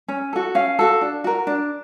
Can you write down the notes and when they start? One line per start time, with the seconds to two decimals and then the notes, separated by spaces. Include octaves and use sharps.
0.08 C#4
0.33 F#4 A4
0.55 C#4 F5
0.79 F#4 A4
1.01 D4
1.24 F#4 A#4
1.47 D4